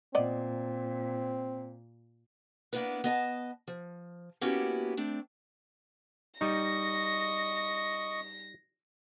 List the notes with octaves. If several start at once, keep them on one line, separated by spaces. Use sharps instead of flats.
A#2 B3 C4 D5 D#5
A#3 B3 D4 E4 B4
B3 D#5 G#5 A5
F3
A#3 B3 C#4 E4 F#4 G4
A3 C4 D4
G3 D#4 D#5 C#6 A#6